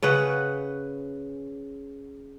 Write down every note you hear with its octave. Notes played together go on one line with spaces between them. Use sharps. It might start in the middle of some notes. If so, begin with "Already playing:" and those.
C#3 C#4 B4 F#5